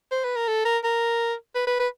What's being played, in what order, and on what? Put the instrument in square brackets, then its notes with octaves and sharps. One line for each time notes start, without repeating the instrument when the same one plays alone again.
[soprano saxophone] C5
B4
A#4
A4
A#4
A#4
B4
B4
B4